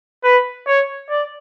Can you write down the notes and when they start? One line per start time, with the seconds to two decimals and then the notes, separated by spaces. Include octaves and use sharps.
0.24 B4
0.67 C#5
1.10 D5